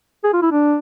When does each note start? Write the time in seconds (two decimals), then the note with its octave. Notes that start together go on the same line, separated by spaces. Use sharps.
0.24 G#4
0.33 F4
0.42 E4
0.51 D4